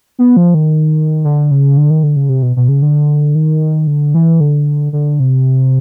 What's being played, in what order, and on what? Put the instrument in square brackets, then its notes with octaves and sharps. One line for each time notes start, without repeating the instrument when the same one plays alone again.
[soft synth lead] B3
F3
D#3
D3
C#3
D3
D#3
D3
C#3
C3
B2
B2
C#3
D3
D#3
D3
E3
D3
D3
C3